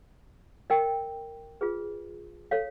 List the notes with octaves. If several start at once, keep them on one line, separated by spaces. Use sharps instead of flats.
A#4 D#5 G5
F4 G#4 B4
A4 C#5 F5